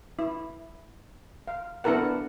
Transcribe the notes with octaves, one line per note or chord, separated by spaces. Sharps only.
E4
F5
B3 D4 E4 A4 A#4 F#5